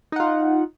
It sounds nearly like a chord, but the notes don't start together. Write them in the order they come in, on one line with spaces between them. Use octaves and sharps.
D#4 F#5 F4